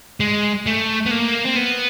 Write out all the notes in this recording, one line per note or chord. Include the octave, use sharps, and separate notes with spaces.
G#3
A3
B3
A#3
C4
B3